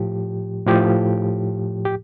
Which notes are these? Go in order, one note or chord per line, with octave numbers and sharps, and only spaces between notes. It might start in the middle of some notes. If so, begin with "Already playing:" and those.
Already playing: A2 F3 G4
A2 F3 G4
G4